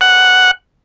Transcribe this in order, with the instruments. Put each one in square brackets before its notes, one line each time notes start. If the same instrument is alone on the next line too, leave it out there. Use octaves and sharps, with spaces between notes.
[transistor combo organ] F#5